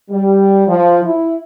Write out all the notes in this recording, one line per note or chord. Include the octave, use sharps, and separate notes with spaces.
G3
F3
E4